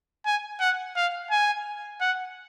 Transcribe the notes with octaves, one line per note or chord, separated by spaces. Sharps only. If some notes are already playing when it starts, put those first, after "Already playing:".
G#5
F#5
F5
G#5
F#5